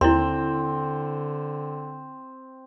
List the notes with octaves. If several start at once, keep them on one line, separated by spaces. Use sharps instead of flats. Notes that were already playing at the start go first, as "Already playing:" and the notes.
D#2 D3 C4 E4 C6